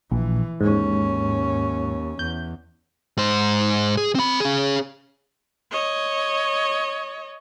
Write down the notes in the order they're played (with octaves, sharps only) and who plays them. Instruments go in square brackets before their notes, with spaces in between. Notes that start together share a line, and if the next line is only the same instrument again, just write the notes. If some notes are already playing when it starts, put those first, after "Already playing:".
[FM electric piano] A#1 [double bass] E3
[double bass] D#2 C#4 [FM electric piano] G#2
[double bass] E2 [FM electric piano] G6
[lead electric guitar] G#2 C5
G#4
C4 B5
C#4 G#4
[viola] C#5 D#5